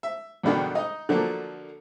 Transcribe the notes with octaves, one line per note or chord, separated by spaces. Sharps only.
E5
E2 G2 B2 D3 D#3
D#4 D#5
D3 F3 F#3 A3 A#3